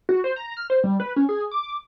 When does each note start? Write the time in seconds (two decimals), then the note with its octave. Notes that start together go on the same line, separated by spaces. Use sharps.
0.09 F#4
0.24 C5
0.36 A#5
0.57 F6
0.70 C5
0.84 G3
1.00 B4
1.16 C#4
1.29 G#4
1.51 D6